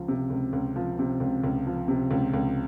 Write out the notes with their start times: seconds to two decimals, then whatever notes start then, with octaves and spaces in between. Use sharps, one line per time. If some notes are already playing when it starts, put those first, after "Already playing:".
Already playing: C#2 F3
0.08 C3
0.30 C#2
0.53 C#2
0.76 F3
0.99 C3
1.20 C#2
1.44 C#2
1.67 F3
1.88 C3
2.11 C#2
2.34 C#2